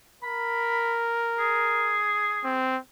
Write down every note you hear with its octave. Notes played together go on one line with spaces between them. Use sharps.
A#4 B5
G#4
C4